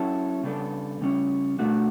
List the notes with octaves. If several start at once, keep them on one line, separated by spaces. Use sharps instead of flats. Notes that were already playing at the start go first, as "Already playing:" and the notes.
Already playing: F#3 C#4 E4 A4
C#3 G3 B3 D4 A4
C#3 G3 C#4
B2 A3 D4 F#4